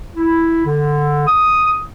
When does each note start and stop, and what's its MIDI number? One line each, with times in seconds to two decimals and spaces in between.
0.16 0.64 64
0.66 1.24 50
1.27 1.79 87